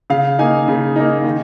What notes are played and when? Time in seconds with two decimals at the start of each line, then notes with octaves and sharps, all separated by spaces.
0.10 C#3 F5
0.39 A#3 D#4 G#5
0.68 C#3
0.96 A#3 D#4
1.24 D#3